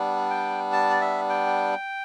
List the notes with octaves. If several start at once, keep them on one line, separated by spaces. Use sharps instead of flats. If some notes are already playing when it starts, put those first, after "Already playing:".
Already playing: G3 B3 D4
G5
A5
D5
E5
G5